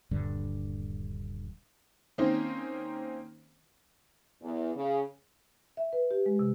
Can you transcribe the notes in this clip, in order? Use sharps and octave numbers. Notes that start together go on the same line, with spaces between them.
D#1 G2 D3
D#3 A#3 C4 C#4 D#4 C5
E2
C#3
E5
B4
G4
G#3
C3